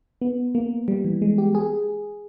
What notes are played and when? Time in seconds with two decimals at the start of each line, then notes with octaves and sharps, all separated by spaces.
0.22 B3
0.55 A#3
0.88 G3
1.05 E3
1.22 G#3
1.38 G4
1.55 G#4